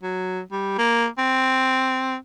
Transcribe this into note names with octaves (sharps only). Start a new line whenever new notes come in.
F#3
G3
A#3
C4